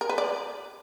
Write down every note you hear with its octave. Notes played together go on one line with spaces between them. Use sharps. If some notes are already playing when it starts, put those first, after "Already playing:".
A#4
B4
D5